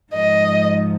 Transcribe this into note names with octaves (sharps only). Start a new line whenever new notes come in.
G#2 F3 D#5